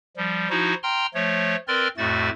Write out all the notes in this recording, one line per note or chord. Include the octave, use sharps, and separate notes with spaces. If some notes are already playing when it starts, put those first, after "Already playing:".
F3 G3
F3 D#4 E4 F#4
G5 A#5 C6 F6
F3 A3 C#5
C4 A#4 B4 D5 C6 F6
F2 A2 A3 F#4 A6